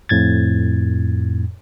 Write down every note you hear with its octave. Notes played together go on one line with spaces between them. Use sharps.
F2 A2 G#6 A6